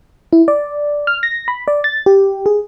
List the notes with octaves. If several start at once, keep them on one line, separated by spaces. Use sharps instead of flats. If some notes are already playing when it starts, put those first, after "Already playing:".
E4
D5
F6
A#6
B5
D5
A6
G4
G#4